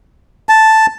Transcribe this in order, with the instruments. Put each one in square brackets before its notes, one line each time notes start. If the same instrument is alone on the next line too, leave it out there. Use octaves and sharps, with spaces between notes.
[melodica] A5